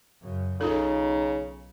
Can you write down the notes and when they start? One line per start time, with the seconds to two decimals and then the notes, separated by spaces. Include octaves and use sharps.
0.23 F#2 C#3
0.61 B1 C#3 D#4 F4 A4